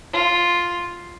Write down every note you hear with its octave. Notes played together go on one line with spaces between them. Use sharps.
F4